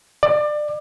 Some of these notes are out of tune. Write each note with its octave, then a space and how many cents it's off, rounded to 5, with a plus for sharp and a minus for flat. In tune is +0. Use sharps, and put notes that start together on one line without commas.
D5 +25